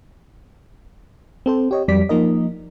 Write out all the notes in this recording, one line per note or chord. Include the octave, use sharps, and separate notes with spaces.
C4 A4 C5
G4 C#5 D#5
F2 F#3 G3 D5 B6
F3 A#3 D#4 A#4 D#5